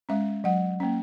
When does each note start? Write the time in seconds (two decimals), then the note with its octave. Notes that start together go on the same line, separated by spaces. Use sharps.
0.09 G#3 C#4 E5
0.44 F#3 F#5
0.80 A#3 C#4